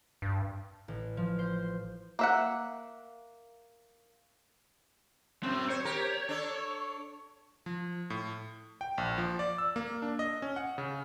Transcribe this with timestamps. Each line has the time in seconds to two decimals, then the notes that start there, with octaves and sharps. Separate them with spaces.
0.22 G2
0.88 A1
1.17 F3
1.39 C5
2.19 A#3 E5 F#5
5.43 F#2 A2 C4
5.70 C5 C#5
5.85 G4 A#4
6.29 D4 A4
7.66 F3
8.10 A2
8.81 G5
8.98 A#1
9.18 F3
9.39 D5
9.58 E6
9.76 A#3
10.02 D4
10.19 D#5
10.42 C#4
10.56 F#5
10.78 C#3